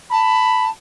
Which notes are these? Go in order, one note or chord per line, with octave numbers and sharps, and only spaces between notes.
A5 B5